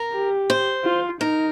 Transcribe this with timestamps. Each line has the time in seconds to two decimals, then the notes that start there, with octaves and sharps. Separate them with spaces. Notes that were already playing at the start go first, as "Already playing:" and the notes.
Already playing: A#4
0.13 G4
0.50 C5
0.84 F4
1.21 D#4 A#4